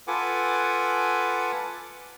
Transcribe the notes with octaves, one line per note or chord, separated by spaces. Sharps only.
F4 A4 B4 F#5 G#5 D6